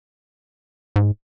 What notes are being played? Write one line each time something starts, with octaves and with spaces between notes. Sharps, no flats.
G#2